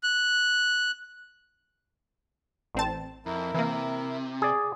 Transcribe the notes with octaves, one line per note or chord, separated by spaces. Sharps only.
F#6
A1 C4 A5
F2 E4 A#4
C3 E3 A#3
G#4 D5